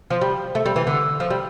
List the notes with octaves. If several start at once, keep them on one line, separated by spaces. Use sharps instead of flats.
F3
G3
A3
G3
E3
D3
F3
G3